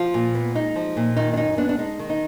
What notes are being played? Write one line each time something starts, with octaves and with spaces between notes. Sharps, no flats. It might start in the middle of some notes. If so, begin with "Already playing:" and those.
Already playing: F3 F4
A#2
B3
G#3 D#4
F3
A#2
D#3 D#4
D4
F#2 D#4
B3 D4
D4
G#3 D#4
D#3
D#4